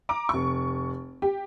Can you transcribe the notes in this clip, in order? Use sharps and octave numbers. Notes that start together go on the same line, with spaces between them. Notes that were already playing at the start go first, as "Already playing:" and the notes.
A#5 D6 D7
F1 C#6
G4